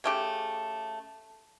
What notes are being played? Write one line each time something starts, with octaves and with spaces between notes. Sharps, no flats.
C#3 A3 G4